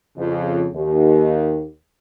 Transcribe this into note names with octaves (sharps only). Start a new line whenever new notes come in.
F2 C#3
D#2